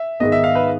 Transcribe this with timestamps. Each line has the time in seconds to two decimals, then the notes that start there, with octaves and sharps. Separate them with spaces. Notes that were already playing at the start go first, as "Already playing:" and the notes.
Already playing: E5
0.20 G#2 D#3 G#3 B3 D#5
0.32 E5
0.44 F5
0.55 B4